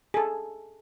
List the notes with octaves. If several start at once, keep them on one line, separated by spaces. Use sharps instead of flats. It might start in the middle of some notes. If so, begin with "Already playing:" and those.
G#4 A4